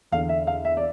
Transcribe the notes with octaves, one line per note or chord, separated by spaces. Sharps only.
E2 D3 F5
E5
F5
E5
D5